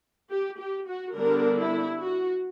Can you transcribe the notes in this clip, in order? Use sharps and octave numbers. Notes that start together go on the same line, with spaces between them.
G4
G4
F#4
D3 G3 B3 D4 A#4
E4
F#4